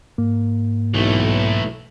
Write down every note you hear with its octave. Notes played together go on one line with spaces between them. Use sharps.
G#2 A#3
B1 E3 A3